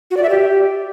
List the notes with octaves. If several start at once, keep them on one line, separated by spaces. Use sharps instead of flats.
F#4
D5
E5
G4